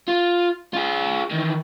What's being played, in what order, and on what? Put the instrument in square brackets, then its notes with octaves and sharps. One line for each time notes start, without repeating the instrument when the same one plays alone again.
[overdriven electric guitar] F4
F4 G#4
D#3 E3